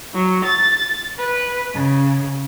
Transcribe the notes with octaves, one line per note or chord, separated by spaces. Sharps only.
F#3
A6
B4
C#3